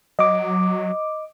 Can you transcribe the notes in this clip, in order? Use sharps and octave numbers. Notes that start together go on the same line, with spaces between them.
F#3 D#5 D6